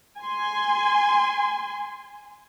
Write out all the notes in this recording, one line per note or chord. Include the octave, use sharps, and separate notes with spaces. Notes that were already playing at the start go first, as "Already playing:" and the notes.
G#5 C6